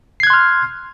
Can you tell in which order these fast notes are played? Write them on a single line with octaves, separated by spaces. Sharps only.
C7 G#6 F#6 C6 F6